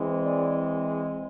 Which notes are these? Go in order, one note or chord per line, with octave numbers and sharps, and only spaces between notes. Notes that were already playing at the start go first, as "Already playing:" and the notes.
Already playing: E3 G#3 C4
D5